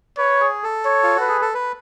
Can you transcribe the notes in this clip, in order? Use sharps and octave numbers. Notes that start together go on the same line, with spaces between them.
B4 C#5
G#4
A4
C#5
F4
F#4 B4
G#4
A4
B4